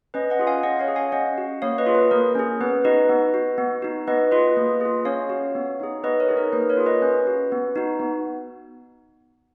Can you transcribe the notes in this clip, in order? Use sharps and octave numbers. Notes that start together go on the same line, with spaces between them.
C#4 B4 D#5
D#5 F#5
F4 G#4
F5 G#5
C#4 D#5 F#5
C#5 F5
G#4
F5 G#5
C#4 D#5 F#5
F#4
A#3 C#5 F5
B4 D#5
F4 G#4
B4
A#3 A#4
C#4 G#4
B3 B4
D#4 F#4 B4 D#5
B3
F#4
B3
D#4 F#4
B3 B4 D#5
F4 G#4 B4 D#5
A#3
F4 G#4
C#4 C#5 F5
F#4
B3
D#4 G#4
B3 B4 D#5
A#4 C#5
D#4 G#4
A#4
A#3 B4
A#4 C#5
F4 G#4
B4 D#5
C#4 B4
F#4
B3
D#4 F#4
B3